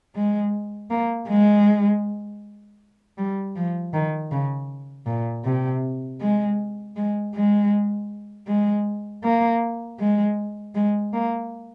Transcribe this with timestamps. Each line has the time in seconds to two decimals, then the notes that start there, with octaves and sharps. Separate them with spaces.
0.15 G#3
0.90 A#3
1.28 G#3
3.17 G3
3.56 F3
3.93 D#3
4.32 C#3
5.06 A#2
5.44 C3
6.20 G#3
6.96 G#3
7.34 G#3
8.47 G#3
9.23 A#3
9.99 G#3
10.75 G#3
11.13 A#3